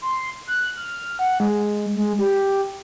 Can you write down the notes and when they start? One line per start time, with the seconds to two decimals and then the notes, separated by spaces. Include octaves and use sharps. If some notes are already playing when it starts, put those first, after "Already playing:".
0.02 C6
0.47 F#6
0.77 F6
1.19 F#5
1.40 G#3
1.96 G#3
2.19 G4